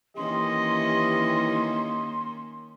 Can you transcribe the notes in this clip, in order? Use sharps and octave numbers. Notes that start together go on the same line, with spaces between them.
D#3 E3 A#3 C#4 G4 D#5 C6